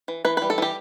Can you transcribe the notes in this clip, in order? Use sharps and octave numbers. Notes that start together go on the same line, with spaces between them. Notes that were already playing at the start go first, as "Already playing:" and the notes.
E3
E3 B4
G3 B4
A4
E3 G4